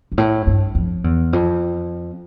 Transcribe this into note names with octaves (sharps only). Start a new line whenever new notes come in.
G2
A2
G2
F2
E2
F2